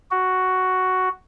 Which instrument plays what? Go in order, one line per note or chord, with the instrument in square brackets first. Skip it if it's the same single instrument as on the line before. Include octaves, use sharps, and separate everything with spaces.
[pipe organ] F#4